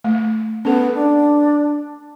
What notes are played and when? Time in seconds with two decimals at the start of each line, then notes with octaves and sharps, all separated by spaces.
0.04 A3
0.65 B3 C#4 A4
0.95 D4